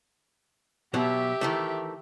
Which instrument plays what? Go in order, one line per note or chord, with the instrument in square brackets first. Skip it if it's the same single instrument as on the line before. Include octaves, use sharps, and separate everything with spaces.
[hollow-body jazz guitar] B2 F#3 B3 [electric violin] G4 E5
[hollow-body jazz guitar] D#3 E3 A3